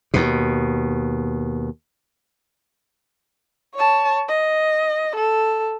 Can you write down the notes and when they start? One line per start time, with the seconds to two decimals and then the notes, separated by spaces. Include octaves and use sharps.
0.14 D#2 B2
3.75 C#5 A5
4.29 D#5
5.16 A4